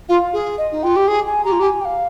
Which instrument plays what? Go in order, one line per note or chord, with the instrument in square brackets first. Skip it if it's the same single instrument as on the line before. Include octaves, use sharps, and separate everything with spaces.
[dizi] F4 [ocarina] F5
[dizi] G#4
[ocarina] D#5
[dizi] D#4
[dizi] F4 [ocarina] G5
[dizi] G4
[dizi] G#4 [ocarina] G#5
[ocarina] G#5
[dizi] G4 [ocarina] A#5
[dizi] F4
G4
[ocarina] G#5
G5
F5